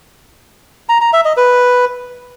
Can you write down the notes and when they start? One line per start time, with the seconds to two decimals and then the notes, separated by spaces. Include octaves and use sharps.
0.89 A#5
1.01 A#5
1.13 E5
1.25 D#5
1.37 B4